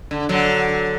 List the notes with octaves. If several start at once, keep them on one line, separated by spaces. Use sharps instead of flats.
D3
D3 F#3